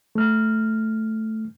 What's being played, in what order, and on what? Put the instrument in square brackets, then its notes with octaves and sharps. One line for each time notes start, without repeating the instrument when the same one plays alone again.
[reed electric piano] A3 F6